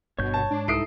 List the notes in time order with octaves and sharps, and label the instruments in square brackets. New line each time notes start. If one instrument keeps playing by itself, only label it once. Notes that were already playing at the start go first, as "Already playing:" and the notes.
[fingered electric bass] G1 G2 [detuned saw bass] B2 [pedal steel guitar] C#5 G6
[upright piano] A5
[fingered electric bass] G#2 [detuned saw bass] D4
[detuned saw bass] C2 [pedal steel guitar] D#4 E4 A4 [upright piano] D#6 C7 D7